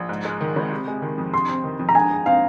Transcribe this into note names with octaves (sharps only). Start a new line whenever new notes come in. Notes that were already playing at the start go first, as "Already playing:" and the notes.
Already playing: A#1
G#2
G#3
D#3
G#1
C3
G#3
D#3
F2
C3 C6
C4
D#3
F2
A#5
G#3 G#5
G#4
C4 F5